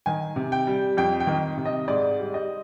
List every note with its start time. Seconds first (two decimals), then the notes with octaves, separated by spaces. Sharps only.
0.06 D#3 G#5
0.36 C3
0.52 G5
0.67 G3
0.97 F2 G5
1.20 G5
1.27 D#3
1.57 C3
1.65 D#5
1.88 G#2 D5
2.19 G3
2.34 D#5